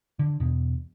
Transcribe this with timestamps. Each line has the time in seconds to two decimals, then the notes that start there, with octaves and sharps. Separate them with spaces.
0.19 D3
0.40 E2 B2